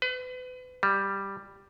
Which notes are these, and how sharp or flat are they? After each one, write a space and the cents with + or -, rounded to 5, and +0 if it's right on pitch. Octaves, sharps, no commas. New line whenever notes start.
B4 +35
G3 +5